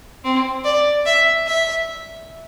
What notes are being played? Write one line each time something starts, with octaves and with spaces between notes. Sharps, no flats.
C4
D5
E5
E5